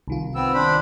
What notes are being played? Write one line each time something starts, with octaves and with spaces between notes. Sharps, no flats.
C2 D#3 F4
B3 C4 E6
D4 C5 B5